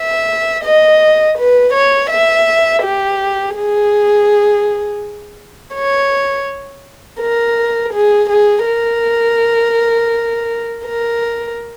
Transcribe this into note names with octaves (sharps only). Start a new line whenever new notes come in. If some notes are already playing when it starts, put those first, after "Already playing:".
Already playing: E5
D#5
B4
C#5
E5
G4
G#4
C#5
A#4
G#4
G#4
A#4
A#4